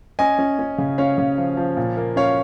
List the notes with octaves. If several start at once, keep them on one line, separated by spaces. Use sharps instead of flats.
C#4 D#5 G#5
C#4
C#4
C#3
C#4 C#5 F5
C#3
F3
F3
A#2
A#3
C#4 C#5 F5